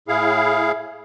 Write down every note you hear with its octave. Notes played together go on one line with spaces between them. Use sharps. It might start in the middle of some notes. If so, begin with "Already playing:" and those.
A2 E4 G#4 F5